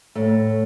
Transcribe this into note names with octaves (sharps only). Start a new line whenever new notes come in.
A2 A3